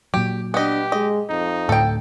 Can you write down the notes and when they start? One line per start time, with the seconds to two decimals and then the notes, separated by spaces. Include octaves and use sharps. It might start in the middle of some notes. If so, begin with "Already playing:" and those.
0.14 A#2 F#3 G4
0.54 B3 D4 G4 D#5
0.92 G#3 D#5
1.30 F2 D#4
1.69 D2 A2 A4 G5